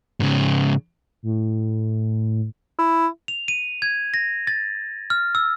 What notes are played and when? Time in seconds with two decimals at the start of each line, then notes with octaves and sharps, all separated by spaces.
0.20 G#2 C#3
1.23 A2
2.78 E4
3.28 F7
3.48 D#7
3.82 G#6
4.14 A#6
4.47 A6
5.10 F6
5.35 E6